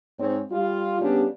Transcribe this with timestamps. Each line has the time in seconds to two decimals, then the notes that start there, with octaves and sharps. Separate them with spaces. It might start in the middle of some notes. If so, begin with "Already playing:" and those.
0.20 G#2 C4 C#5
0.51 G3 F4
1.01 C#3 G3 B3 C#4 D4 G4